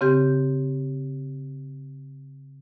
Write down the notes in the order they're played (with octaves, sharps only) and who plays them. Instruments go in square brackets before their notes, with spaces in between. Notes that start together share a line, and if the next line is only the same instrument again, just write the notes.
[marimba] C#3 C4 G4 G6